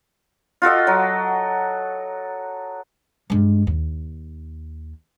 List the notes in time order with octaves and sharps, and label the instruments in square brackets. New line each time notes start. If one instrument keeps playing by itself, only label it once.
[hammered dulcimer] F4 F#4 A4 D#5
F#3
[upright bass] G2 G#3
D#2